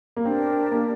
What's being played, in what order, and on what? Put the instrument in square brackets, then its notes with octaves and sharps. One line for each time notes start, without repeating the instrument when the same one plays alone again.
[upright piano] A#3
[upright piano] C4 [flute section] D4 G4 A#4
[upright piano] A#3